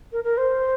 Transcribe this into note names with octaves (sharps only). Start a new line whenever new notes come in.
A#4
A#4
C5